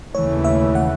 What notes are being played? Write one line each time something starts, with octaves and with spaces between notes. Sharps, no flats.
D#2 C#3 E3 A3 C#5
E5
F#5